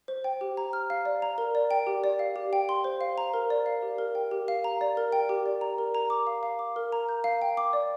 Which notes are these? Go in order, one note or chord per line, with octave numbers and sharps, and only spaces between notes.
C5
G5
G4
A#5
F6
F5
D5
A#5
A#4
D5
G5
G4
D5
F5
G4
G5
C6
C5
F5
A#5
A#4
D5
F5
G4
A#4
G5
G4
F5
A#5
D5
A#4
G5
G4
D5
A#5
A#4
A#5
D6
F5
F5
D6
A#4
A#5
G6
F5
G5
D6
D5